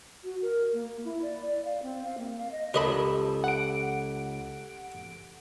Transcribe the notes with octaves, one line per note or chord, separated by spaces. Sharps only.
F#4
A#4
A#3
E4
D5
D5
F5
C4
F5
A#3
F5
D#5
C#2 G4 A4 A#4 D#5 A5 B5
F#5 D7